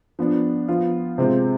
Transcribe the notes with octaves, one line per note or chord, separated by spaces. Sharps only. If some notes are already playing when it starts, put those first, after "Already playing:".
F3 B3 D4
F3 B3 F4
C3 G#3 C4 F4